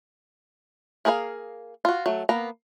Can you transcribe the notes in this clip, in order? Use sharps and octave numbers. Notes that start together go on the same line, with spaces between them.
A#3 G#4 A#4 B4 F5
F4 F#4
F#3 A3
A#3 B3 A#5